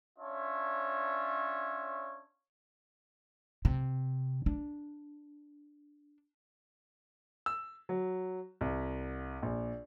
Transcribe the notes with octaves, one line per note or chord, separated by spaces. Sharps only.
C#4 D4 F4 C#5 E5
C3
D4
E6
F#3
C2
A#1